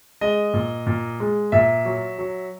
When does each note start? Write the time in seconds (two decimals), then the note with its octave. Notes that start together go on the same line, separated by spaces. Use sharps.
0.21 G#3 D#5
0.54 A#2
0.87 A#2
1.20 G#3
1.52 A#2 E5
1.85 F#3
2.18 F#3